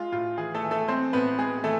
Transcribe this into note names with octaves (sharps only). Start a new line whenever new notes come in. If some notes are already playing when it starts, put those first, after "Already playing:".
Already playing: G#3 F4
A2 F4
E3 G#4
A3 A4
E3
A3 A4
G#3 C4 C5
A2 B3 B4
G#3 G#4
G#4
E3 A3 A4